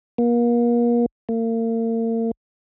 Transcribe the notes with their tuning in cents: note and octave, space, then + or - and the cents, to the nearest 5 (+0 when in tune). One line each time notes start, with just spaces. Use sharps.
A#3 +35
A#3 -40